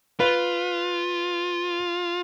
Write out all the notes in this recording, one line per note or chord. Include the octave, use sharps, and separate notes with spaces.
F4 B4